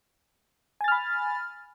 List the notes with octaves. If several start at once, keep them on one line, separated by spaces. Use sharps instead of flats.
G#5 B5 F6 A6